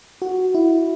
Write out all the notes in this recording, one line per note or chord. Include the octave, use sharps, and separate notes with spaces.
F#4
E4